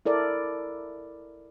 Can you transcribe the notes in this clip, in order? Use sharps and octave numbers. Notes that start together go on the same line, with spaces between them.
E4 A4 A#4 D5